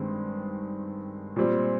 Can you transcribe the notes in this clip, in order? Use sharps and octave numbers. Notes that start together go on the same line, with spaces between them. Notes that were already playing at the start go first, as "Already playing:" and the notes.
Already playing: G2 D#3 G#3 C4
A#2 G3 C4